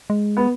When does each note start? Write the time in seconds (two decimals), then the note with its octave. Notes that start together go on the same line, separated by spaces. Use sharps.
0.10 G#3
0.37 B3